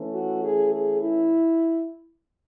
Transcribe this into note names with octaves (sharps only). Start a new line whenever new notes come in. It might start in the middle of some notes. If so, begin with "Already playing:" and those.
Already playing: E3 A3 C#4
F#4
G#4
G#4
E4